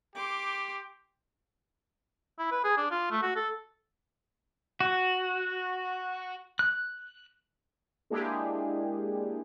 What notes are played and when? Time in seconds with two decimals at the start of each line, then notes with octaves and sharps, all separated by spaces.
0.15 G4 C6 D6
2.39 E4
2.51 B4
2.64 G#4
2.77 D4
2.91 F4
3.11 A3
3.22 F#4
3.36 A4
4.81 F#4
6.59 F#6
8.10 G#3 A#3 D4 E4 G4 G#4